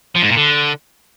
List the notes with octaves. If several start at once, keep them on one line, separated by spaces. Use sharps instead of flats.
F3
G#2
A#2
D3